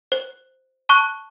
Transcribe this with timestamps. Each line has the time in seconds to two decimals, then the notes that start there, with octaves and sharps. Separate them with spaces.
0.12 C5
0.89 A5 C#6 F#6